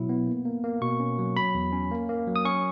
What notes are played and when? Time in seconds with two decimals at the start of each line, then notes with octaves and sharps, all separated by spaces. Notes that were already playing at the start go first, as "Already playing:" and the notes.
Already playing: B2 F#3 E4
0.09 B3
0.27 A#3
0.45 A#3
0.64 A#3
0.82 B2 C#6
1.00 C#4
1.18 F#3
1.36 F#3 B5
1.54 E2
1.72 C#4
1.91 A#3
2.09 A#3
2.27 F#3
2.36 D#6
2.45 C#4 C#6